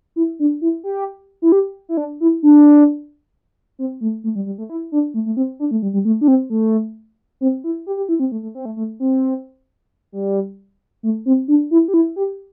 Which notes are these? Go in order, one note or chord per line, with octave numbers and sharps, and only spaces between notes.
E4
D4
E4
G4
E4
G4
E4
D4
E4
D4
C4
A3
A3
G3
G3
A3
E4
D4
A3
A3
C4
D4
A3
G3
G3
A3
D4
C4
A3
C4
E4
G4
G4
E4
C4
A3
A3
C4
A3
A3
C4
G3
A3
C4
D4
E4
G4
E4
G4